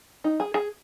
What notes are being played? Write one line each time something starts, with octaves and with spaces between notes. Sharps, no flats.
D#4
G#4
G#4